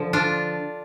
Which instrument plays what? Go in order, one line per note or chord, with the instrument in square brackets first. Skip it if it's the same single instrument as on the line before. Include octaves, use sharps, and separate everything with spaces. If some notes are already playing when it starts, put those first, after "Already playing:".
Already playing: [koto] D3 F3
D4 F4